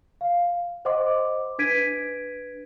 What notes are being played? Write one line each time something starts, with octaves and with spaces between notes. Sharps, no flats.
F5
C5 D#5 F#5 C6 D6
D4 B4 G#6 B6 D7 D#7